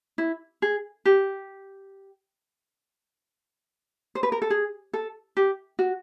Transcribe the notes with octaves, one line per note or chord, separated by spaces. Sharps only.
E4
G#4
G4
C5
B4
A#4
A4
G#4
A4
G4
F#4